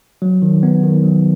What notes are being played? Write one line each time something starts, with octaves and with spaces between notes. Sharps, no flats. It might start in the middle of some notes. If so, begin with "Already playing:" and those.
F#3
D#3
B3
D#3
F#3